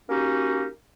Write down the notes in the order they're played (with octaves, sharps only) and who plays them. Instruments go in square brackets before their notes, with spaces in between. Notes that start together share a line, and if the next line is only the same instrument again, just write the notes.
[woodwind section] A#3 C#4 D#4 F#4 G4